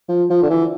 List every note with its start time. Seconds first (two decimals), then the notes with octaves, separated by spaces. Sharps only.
0.09 F3
0.30 F3
0.42 D3
0.50 E3